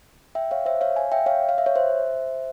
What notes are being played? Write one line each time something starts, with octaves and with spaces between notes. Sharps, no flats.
E5 G5
C#5 F5
C5 E5
C#5 F5
F5 G#5
E5 G5
C#5 F5
F5
E5
C#5
C5 E5